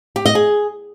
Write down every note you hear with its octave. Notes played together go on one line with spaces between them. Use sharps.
G4
D#5
G#4